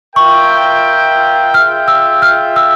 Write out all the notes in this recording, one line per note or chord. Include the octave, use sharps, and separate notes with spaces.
F4 A#4 E5 G5 C#6
F4 G#4 E5 G5 F6
E6
F6
E6